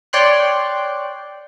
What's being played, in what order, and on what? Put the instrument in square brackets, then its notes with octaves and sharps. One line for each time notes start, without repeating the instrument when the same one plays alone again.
[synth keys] C#5 D5 G5 C6 F#6